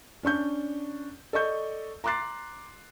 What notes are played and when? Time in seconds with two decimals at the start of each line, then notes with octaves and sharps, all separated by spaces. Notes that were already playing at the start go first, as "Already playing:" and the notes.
0.23 C#4 D4 C#6 G6
1.33 A4 D5 D#5 C#6 G6
2.04 A#5 C6 D6 F#6 A6 C7